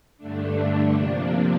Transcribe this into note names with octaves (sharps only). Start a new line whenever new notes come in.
G2 D3 A3 D4
C3 F3 A#3 D4